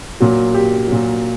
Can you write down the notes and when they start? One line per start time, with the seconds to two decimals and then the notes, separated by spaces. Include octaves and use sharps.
0.20 A#2 F#3
0.54 G4
0.88 A#2 F#3